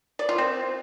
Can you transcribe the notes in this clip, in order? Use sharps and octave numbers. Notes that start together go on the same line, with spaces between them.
D5
F4
C4